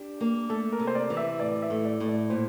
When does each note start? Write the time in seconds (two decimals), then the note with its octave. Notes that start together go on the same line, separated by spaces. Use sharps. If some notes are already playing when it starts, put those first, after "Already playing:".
Already playing: D4 G4
0.21 A#3
0.50 A3 A4
0.73 A#4
0.79 C3
0.87 C5
0.95 D5
1.10 E3
1.17 E5
1.40 A2 D5
1.62 E5
1.70 A2
1.85 D5
2.00 A2
2.08 D5
2.30 A#2 C5